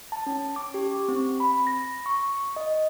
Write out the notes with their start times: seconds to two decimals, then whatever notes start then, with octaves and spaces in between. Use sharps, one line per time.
0.12 A5
0.26 C#4
0.56 D6
0.74 G4
1.08 C4
1.40 B5
1.67 A#6
2.06 C#6
2.56 D#5